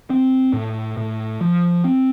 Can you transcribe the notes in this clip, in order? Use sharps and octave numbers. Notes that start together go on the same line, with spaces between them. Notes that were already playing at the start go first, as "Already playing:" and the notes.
C4
A2
A2
F3
C4